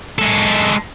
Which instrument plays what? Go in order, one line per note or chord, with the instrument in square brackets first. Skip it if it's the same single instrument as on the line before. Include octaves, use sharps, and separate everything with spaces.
[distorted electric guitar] G#3 A4